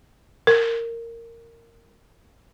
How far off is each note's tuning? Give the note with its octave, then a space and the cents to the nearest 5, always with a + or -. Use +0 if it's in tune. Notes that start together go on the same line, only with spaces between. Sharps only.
A#4 -15